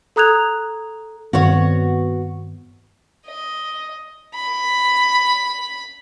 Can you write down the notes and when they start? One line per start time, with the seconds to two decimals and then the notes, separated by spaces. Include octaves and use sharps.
0.16 A4 A#5 D#6 F#6 G#6 F7
1.33 G2 D#3 B3 C4 F#4 C#5
3.26 D#5
4.34 B5